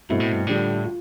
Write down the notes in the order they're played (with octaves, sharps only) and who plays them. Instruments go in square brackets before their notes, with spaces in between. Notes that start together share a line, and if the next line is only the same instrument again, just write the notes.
[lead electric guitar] G2 [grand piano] B2 A3 C4 E4
[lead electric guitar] A2
G2
[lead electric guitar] A2 [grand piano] D3 G3 D4 F4
[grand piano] F4